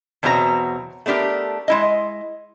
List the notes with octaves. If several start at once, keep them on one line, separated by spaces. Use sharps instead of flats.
E2 B2 F#3 C4 E4 A#5
A3 B3 D4 G4 A#4
G#3 E4 D#5